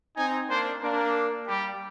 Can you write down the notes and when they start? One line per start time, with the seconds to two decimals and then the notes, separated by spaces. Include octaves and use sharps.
0.17 C4 D#4 G#5
0.50 A#3 D4 C5
0.82 A#3 D4 A#4
1.48 G3 G4